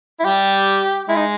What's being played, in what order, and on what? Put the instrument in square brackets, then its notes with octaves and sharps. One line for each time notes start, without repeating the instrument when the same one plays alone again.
[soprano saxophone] E4
[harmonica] G3 [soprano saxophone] G4
[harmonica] G#3 [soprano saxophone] E4
[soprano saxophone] D#4